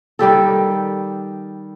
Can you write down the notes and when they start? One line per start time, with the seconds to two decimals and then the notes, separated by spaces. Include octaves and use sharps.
0.19 D#3 G3 G4 A4